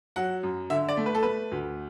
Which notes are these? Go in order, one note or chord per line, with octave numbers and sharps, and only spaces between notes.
F#3 F#5
F#2
D3 E5
D5
A3
B4
A4
A3 B4
D2